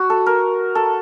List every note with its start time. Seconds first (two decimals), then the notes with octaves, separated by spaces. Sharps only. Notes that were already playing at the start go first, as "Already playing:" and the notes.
Already playing: F#4
0.10 A4
0.26 A#4
0.75 A4